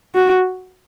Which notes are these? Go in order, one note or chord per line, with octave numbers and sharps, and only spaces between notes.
F#4